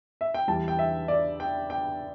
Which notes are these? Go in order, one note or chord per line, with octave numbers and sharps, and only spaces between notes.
E5
G5
E2 E3 G3 A5
G5
E5
D5
G5
G5